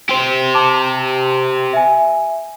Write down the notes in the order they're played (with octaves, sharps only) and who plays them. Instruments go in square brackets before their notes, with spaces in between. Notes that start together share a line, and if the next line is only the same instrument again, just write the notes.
[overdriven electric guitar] G4 C5
[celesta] A5 D6
E5 G#5